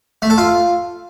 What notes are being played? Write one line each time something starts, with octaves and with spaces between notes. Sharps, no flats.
A3
A4
F4